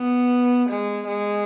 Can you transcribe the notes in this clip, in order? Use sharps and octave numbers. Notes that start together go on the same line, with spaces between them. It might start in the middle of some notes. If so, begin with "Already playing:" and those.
Already playing: B3
G#3
G#3